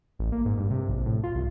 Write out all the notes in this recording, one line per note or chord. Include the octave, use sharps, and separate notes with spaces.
A1
A#3
G#2
G2
C3
A#1
A2
F4
C2